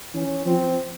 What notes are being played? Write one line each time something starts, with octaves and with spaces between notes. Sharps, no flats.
E3 C#4
F3 C4